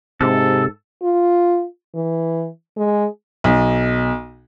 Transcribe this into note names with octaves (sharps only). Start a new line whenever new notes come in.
G#2 C3 A4
F4
E3
G#3
B1